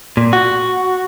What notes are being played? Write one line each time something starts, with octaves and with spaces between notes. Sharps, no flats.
A#2
F#4